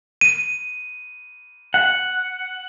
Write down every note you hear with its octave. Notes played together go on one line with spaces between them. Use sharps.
D#7
F#5